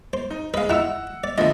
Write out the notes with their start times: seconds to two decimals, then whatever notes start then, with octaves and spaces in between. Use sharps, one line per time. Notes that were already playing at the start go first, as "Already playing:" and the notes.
0.13 C5
0.30 D#4
0.54 G#3 B4 D#5 F5
0.69 D#4 E4 F#5 E6
1.24 D5
1.38 A1 D3 F3 A3 D#5